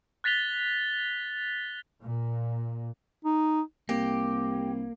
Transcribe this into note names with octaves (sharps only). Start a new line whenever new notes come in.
F#6 A6 B6 F7 G7
A#2
D#4
C2 A#3 G4